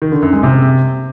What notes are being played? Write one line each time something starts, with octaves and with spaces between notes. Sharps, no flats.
D#3
D3
F#2
G#3
C3